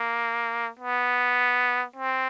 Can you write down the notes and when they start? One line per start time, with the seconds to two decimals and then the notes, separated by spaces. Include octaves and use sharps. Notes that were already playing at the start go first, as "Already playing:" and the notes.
Already playing: A#3
0.79 B3
1.96 C4